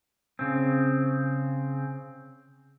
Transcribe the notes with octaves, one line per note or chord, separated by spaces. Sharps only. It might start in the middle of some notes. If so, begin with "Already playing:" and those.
C#3 C4